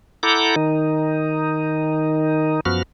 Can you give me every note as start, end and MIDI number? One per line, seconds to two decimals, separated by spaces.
0.23 0.55 64
0.23 0.55 69
0.23 0.55 78
0.23 0.55 82
0.23 0.55 86
0.23 0.55 91
0.56 2.60 51
0.56 2.60 63
2.66 2.83 42
2.66 2.83 53
2.66 2.83 59
2.66 2.83 66
2.66 2.83 89